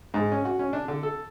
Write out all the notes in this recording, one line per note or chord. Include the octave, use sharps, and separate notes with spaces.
G#2
C#4
F#4
C#4
D4
D3
A4